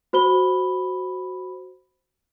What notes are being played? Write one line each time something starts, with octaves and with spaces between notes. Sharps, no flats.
F#4 C5 B5 G7